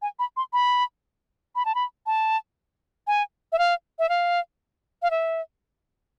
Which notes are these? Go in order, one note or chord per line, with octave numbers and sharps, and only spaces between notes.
G#5
B5
C6
B5
B5
A5
B5
A5
G#5
E5
F5
E5
F5
F5
E5